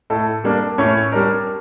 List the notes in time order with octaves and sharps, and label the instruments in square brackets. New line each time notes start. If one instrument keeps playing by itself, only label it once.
[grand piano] A2 A4
G3 A#3 D4
A2 C#4 C#5
G3 D4 A#4